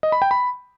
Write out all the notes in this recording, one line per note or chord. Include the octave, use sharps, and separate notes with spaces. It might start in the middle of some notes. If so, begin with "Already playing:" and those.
D#5
B5
G5
B5